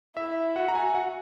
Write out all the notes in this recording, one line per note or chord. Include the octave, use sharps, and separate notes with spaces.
E4 E5
F#4 F#5
A#5
G#5
F#5